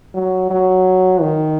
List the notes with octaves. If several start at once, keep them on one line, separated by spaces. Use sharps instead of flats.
F#3
F#3
D#3